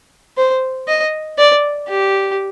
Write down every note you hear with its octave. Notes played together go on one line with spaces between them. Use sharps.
C5
D#5
D5
G4